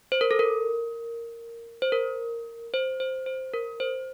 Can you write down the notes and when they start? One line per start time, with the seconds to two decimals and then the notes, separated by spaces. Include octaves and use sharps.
0.12 C5
0.21 A#4
0.31 A4
0.39 A#4
1.82 C5
1.92 A#4
2.74 C5
3.00 C5
3.26 C5
3.54 A#4
3.80 C5